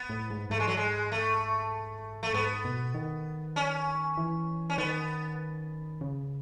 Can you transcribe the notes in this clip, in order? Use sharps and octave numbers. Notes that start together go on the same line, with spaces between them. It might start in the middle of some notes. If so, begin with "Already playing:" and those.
Already playing: B3
A2
G#2
G#2 A3
G#3
F#3
G#3
A3
A3
G#2 B3
B2
D#3
C#4
E3
C#4
D#3 B3
C#3